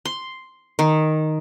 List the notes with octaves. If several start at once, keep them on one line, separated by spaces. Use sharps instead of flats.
C6
D#3